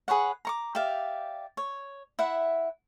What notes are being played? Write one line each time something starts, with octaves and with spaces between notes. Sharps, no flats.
G#4 B4 C#5 F#5
A#5 C#6 D6
G4 D5 E5 F5
C#5
E4 E5 F#5